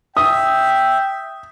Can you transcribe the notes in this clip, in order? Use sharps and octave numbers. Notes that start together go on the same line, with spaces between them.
E5 G5 D#6